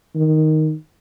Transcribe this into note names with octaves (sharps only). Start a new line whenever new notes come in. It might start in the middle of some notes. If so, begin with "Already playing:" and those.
D#3